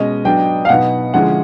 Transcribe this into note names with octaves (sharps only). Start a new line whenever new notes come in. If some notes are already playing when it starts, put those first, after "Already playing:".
Already playing: B2 G#3 C#4 D#5
F#3 B3 D4 G5
F5
B2 F#3 B3 D#4 F#5
D3 F3 G#3 C#4 E4 F#5